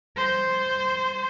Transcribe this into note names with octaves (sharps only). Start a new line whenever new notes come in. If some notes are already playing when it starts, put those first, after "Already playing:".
C5